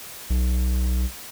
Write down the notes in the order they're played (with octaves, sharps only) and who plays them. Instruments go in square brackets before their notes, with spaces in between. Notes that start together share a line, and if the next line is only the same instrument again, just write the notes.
[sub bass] B1